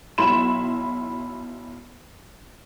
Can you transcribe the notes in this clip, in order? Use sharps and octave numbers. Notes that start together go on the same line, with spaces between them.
B1 F#3 E4 B5 C6 E7